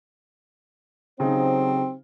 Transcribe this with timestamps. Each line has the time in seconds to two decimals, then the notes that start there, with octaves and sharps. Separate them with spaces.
1.20 C#3 F#3 C4 D#4 G4 C5